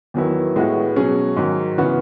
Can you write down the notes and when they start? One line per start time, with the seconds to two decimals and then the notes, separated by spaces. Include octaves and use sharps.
0.14 E2 D#3 F#3 B3 E4
0.56 A2 G#3 B3 F#4
0.96 B2 F#3 C#4 G#4
1.36 G#2 D#3 F#3
1.78 C#3 E3 B3 F#4